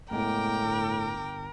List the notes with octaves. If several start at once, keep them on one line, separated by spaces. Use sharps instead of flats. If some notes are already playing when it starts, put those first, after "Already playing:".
F#1 A2 G#3 B3 A#4 G5 D6
G1